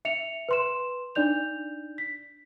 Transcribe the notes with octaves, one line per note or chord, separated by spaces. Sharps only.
E5 C#7 F7
B4 C6 E7
D4 D#4 D5 G6 F7
B6